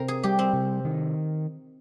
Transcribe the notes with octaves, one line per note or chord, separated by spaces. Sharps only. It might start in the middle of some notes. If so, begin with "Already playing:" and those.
Already playing: C3 C4 A#4 C5
G#4
G3 G4
C4
C3
D#3